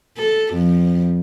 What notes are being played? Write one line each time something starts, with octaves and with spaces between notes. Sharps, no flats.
A4
F2